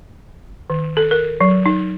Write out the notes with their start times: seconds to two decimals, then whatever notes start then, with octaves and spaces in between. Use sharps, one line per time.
0.70 D#3
0.97 A4
1.11 A#4
1.41 F#3
1.66 D#4